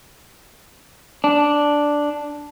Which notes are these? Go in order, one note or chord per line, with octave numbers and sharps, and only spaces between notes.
D4